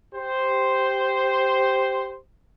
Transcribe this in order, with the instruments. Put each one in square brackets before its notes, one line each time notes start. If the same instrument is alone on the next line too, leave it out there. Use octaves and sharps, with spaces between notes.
[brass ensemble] G4 C5